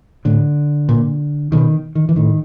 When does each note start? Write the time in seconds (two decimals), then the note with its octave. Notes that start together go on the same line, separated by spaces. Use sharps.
0.25 A2 D3
0.89 A#2
1.52 B2 D#3
1.95 D#3
2.09 E3
2.16 A2 D#3